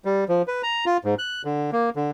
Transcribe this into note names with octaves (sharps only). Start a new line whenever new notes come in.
G3
F3
B4
A#5
F4
G#2
F#6
D3
A#3
D3